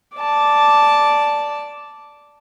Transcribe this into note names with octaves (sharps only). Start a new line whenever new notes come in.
D5 A5